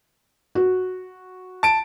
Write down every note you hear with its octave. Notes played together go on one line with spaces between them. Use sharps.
F#4
A5 D7